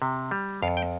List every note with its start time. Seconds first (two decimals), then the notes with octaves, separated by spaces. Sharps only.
0.02 C3
0.31 G3
0.62 F2 F5
0.77 G5